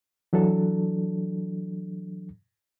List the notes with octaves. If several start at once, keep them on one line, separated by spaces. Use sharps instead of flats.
E3 F#3 D4 A4